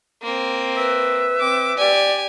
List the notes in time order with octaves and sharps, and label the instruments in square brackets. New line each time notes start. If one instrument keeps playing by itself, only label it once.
[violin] A#3 C4
[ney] B4 [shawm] E5
[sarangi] C4 [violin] D6
[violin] G4 G#5 [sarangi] D5